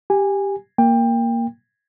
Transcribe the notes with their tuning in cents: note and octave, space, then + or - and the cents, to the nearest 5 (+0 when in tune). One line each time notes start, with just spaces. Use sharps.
G4 +5 G#5 -15
A#3 +0 G5 +25